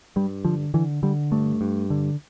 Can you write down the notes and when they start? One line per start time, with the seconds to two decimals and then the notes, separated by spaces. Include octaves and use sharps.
0.16 G2 G3
0.45 D3 F3
0.74 D3 E3
1.03 D3 G3
1.32 G2 A3
1.61 G2
1.90 D3